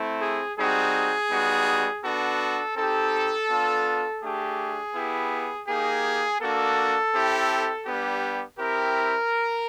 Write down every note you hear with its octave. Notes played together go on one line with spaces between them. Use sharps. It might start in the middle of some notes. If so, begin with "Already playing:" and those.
Already playing: A3 C4 E4
G#4
G3 C4 D#4 F#4 G#4
G3 B3 D#4 F#4
B3 D4 F#4 A4
C4 D#4 G4 A4
B3 D4 F4
A3 D4 G4 G#4
B3 E4 G4
A#3 D#4 G4 G#4
A#3 D4 F#4 A4
C4 E4 G4
G3 B3 D4 G4
C4 E4 G4 A#4